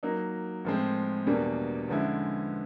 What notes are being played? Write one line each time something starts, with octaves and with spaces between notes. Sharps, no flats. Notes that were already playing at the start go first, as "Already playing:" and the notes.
F#3 A#3 D#4
A2 F3 G#3 C4
E2 B2 G3 A#3 D4
D3 F3 G#3 C#4 E4